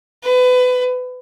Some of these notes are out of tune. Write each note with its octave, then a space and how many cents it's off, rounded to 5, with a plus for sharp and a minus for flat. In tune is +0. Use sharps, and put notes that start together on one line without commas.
B4 +25